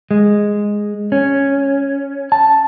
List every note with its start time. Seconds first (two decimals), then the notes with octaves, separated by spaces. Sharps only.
0.11 G#3
1.12 C#4
2.32 A5